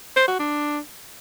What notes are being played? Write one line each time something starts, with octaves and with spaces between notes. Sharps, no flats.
C5
F#4
D4